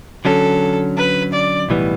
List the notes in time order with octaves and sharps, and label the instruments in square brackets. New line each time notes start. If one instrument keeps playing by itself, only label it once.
[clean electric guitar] D3 F#3 C#4 [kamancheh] A4
[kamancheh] B4
D5
[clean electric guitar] B1 A2 E3 G3 B3